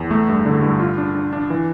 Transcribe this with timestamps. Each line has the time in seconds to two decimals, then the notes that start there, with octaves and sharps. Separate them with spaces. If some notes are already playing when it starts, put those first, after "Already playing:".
Already playing: E2
0.11 A3
0.29 G2
0.46 D3
0.62 G2
0.79 F4
0.98 D4
1.15 D4
1.33 D4
1.50 E3